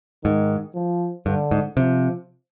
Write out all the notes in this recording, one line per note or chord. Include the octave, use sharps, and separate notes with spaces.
G#2 D#3
F3
G2 D3
G#2
C3 F3